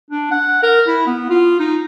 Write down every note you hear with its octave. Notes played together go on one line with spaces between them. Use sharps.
D4
F#5
A#4
E4
B3
F4
D#4